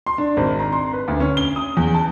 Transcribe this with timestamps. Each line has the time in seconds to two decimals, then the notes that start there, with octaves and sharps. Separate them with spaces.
0.06 C6
0.18 D4
0.37 G#1
0.59 A#5
0.73 C6
0.93 B4
1.08 D2
1.20 C#4
1.37 G7
1.56 D#6
1.77 E2
1.94 A5